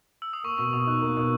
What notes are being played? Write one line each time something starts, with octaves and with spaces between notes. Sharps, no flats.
E6
D#6
A#3 C#6
B2 C#6
B2 D#6
D#4 F#6
A#3
B2